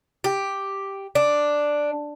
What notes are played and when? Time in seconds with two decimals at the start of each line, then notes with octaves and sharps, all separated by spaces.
0.24 G4
1.15 D4